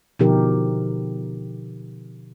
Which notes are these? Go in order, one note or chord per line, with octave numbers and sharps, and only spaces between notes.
B2 D3 F3 D#4 G4 A#4